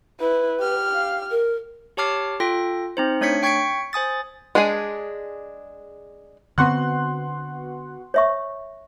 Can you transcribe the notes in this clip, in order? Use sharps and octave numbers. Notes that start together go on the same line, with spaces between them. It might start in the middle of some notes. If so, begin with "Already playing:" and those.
E4 B4
G4 F6
F5
A#4
G4 C#5 A5 D6 F6 C7
F4 A4 G5 A#6
C4 D#4 C5
A3 D4 C#5 G#6 B6 C#7
G5 C#6 G#6 B6 C#7 D7
C5 G#5 D#6 A6
G#3 D4 G#4 G#5
D3 B3 C4 F#4 F#5 C6 F#6
C#5 E5 C#6